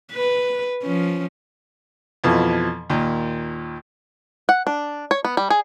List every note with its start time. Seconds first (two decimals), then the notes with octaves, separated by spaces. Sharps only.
0.12 B4
0.83 F3 C#4
2.24 F2 B2 E3 F3
2.90 D#2 A#2
4.49 F#5
4.67 D4
5.11 C#5
5.25 B3
5.37 G3
5.50 G#4